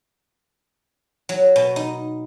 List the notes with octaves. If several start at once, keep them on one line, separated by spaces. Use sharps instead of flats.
F#3
B2
D#4